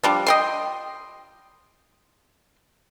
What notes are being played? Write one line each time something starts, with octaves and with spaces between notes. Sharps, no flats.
F3 G3 D4
D#5 G5 C6